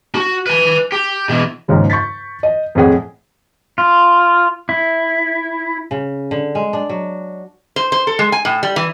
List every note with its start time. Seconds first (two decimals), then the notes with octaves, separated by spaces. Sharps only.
0.15 F#4
0.47 B4 G#5
0.92 G4
1.29 B2 E3
1.68 D#2 G#2 C#3 F3
1.90 C#6 G6 A6 B6
2.43 D#5
2.75 F2 A2 G#4 F#5
3.78 F4
4.69 E4
5.91 C#3
6.31 D3
6.55 G#3
6.73 D4
6.89 F#3
7.76 C5
7.92 C5
8.07 A4
8.19 G#3
8.32 G#5
8.45 A2
8.63 G3
8.76 E3